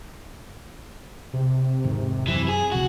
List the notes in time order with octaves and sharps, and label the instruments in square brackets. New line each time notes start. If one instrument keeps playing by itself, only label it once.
[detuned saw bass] C3
[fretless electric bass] E1 G#2 D#3
[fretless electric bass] F#2 [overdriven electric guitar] E3
[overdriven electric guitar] G#4
[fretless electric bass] F1 C#2 C3 [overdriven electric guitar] F#4